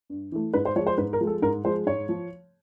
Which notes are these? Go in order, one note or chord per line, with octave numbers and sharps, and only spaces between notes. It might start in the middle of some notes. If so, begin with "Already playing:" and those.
G2
E3 A3
G#2 B4
C5
F3 G#3 C#5
C5
G#2 B4
A#4
F3 G#3
A4
G#2 A#4
F3 G#3 C5
G#2 C#5
F3